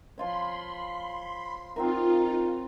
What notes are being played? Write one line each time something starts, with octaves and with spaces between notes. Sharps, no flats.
F3 F4 C#5 B5 C6
C4 D#4 F4 F#4 A#4